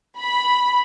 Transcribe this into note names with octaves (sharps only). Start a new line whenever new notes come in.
B5